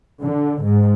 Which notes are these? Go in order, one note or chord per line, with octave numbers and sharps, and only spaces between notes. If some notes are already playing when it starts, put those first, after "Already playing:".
D3
G#2